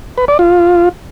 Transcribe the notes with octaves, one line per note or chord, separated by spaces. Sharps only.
B4
D5
F4